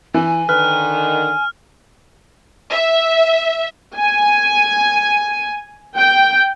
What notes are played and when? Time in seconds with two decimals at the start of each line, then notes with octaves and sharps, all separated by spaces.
0.14 E3 G#5
0.49 D3 D#3 B4 F6
2.71 E5
3.96 G#5
5.97 G5